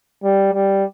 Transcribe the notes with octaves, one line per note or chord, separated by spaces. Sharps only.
G3
G3